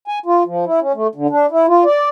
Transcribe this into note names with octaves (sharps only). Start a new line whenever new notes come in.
G#5
F4
F3
E4
C#4
A3
D3
D4
E4
F4
D5